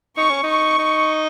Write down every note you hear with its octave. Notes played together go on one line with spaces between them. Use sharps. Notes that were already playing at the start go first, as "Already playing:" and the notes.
D#4 C#6
C#4
D#4 C#6
D#4